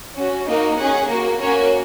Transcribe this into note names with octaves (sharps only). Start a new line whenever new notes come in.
C#4 F#4
A#3 D#4 F#4
C#4 G#4 F#5
A#3 F#4
A#3 C#4 F#4 C#5